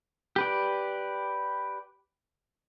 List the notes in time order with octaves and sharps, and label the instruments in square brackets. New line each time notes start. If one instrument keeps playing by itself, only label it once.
[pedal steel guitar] G4 B4 D5